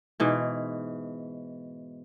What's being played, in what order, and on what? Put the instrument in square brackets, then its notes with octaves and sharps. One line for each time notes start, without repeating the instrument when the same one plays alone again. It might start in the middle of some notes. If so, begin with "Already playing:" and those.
[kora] G#2 B2 E3